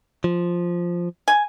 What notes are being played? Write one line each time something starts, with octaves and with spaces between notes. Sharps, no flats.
F3
G#5